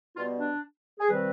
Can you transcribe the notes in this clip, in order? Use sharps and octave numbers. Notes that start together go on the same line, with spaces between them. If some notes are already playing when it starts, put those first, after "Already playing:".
B2 G3 B3 F4
D4
G#4
C3 D#3 G3 C4 B4